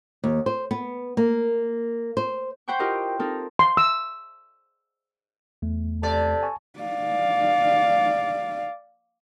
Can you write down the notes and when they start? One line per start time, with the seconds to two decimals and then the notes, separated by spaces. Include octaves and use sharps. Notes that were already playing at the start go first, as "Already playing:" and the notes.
0.24 D#2
0.46 C5
0.71 B3
1.17 A#3
2.17 C5
2.68 C5 F#5 G5 B5 C#6
2.79 E4 F4 G4 A#4 D#5
3.19 C4 D#4 A4 A#4
3.59 C6
3.77 E6
5.62 E2 A3
6.03 C3 A4 D5
6.43 G#5 A5 C#6
6.80 D5 F5